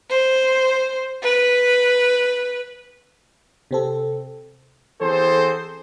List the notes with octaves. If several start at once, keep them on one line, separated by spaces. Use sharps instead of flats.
C5
B4
C3 C4 A4
E3 B3 C4 G#4 A4 C5